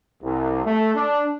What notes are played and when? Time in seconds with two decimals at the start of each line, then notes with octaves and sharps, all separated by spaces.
0.23 C2
0.64 A3
0.95 D4